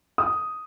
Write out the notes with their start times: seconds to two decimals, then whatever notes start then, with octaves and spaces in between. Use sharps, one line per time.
0.18 D#6